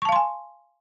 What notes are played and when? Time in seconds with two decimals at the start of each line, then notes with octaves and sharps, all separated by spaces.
0.02 C#6
0.05 A5
0.09 F5
0.12 C6
0.16 G#5